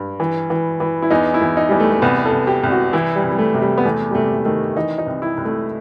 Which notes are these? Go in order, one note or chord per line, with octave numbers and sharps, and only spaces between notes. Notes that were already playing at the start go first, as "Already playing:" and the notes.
Already playing: G2
E3
E3
E3
E4
E2 D#4
E4
E2
D#4
E2 G3
A3
A3
C2 B3
A4
C2
G4
C2
F#4
E3 E4
G3
C2
G3
A3
C3
G3
B3
E2 A3
G3
C3 A3
D#3 A3
E3 D#4
D#4
C2
E4
C2
A3